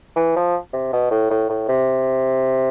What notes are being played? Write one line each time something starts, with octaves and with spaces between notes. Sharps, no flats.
E3
F3
C3
B2
A2
A2
A2
C3